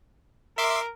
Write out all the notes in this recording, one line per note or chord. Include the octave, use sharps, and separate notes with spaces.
A#4 E5 C6 D6